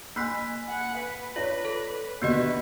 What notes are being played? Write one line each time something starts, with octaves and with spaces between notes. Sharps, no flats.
A#3 G#5 B5 F#6 B6
F#5 G#5
B4
F4 C#5 D5
A4
D#2 B2 D3 A#3 B3 F#4 B4 D#5